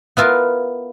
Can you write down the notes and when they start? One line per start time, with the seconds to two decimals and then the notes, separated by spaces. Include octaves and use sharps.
0.17 B3 E4 F4 A#4